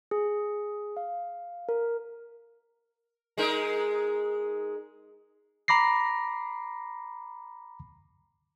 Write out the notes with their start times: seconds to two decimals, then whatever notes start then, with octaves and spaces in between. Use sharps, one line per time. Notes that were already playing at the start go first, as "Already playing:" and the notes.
0.11 G#4
0.97 F5
1.69 A#4
3.38 G#3 D#4 A#4
5.68 A#5 B5 D6 A#6 C7